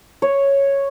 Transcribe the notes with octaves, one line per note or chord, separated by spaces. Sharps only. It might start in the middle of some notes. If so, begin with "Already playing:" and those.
C#5